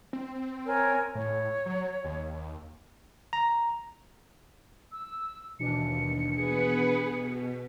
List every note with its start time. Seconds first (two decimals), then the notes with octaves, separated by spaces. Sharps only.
0.13 C4
0.66 A#4 C#5 G#5
1.15 A2 C#5
1.66 F#3
2.04 D#2
3.33 A#5
4.92 E6
5.59 D#2 B2 E3 D4 C#7
6.37 B3 G#4 B4
7.13 B2